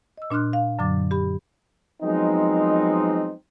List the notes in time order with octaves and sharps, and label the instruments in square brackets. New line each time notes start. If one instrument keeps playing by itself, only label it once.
[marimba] D#5 E6
A#2 D4 C6 F6 F#6
F5
F#2 D3 F#3 D6 A6
G4 B5
[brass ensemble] F3 F#3 G#3 B3 C4 D#4